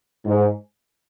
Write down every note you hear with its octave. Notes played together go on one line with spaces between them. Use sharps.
G#2